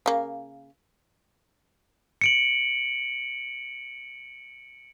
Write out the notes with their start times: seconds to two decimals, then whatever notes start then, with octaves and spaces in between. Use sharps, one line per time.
0.06 C#3 A#3
2.21 C#7 D7 F#7